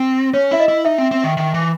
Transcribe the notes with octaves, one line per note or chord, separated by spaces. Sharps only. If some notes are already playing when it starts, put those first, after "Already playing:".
Already playing: C4
C#4 C#5
E4 E5
D#5
E4
D#4 E5
C4
C4
D#3
D#3
E3